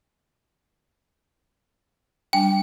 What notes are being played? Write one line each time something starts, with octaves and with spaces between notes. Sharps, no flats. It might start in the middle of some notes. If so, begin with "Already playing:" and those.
G3 D4 G5 G#5